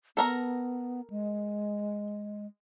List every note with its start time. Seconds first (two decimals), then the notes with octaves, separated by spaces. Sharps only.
0.17 B3 A4 A#4 A#5
1.10 G#3